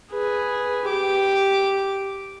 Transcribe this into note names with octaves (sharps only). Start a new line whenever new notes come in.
G#4 B4
G4 D6